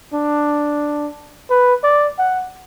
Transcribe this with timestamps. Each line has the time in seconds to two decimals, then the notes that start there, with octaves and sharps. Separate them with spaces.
0.14 D4
1.50 B4
1.83 D5
2.18 F#5